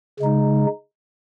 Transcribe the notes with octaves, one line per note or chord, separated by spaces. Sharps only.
C#3 G#3 D#4